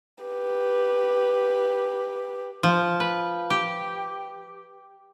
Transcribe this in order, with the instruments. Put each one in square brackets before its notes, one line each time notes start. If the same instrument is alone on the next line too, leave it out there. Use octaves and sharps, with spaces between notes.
[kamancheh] G4 B4
[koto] F3
B4
G4